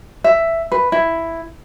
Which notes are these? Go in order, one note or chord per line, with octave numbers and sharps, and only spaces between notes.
E5
B4
E4